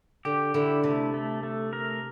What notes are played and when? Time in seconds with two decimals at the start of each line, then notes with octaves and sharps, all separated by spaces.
0.25 D3 G4
0.54 D3 E4
0.84 C3 A3
1.14 A3
1.43 A3
1.73 A#4